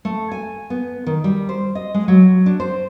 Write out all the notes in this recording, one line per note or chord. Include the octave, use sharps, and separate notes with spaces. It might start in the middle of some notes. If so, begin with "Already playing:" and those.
A3
G#5
B3
D#3
G3
C5
D#5
G#3
F#3
D4
C5